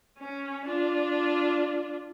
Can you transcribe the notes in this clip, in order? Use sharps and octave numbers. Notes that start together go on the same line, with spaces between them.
C#4
D4 F4